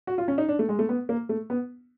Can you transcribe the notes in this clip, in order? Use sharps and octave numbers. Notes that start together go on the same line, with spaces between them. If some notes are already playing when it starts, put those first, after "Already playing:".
F#4
F4
C#4
D#4
D4
A3
G#3
A3
B3
A#3
A3
B3